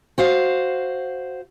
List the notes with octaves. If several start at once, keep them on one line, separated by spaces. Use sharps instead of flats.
F#4 C5 F5